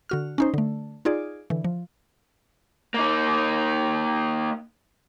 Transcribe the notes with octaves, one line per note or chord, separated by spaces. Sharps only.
D3 F#4 F6
C#4 D#4 C5
D3 A3
D#4 F4 G#4 D5
D3 E3
F3
A#3 D#4